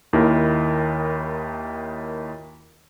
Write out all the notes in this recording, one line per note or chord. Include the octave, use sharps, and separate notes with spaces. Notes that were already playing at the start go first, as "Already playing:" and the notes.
D#2 D#3 E4 F4 A#4